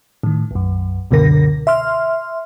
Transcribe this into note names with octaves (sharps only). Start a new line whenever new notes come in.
A2 D#3
B1 F#2
C#2 F#2 B2 D3 A#4 A#6
E5 C6 F6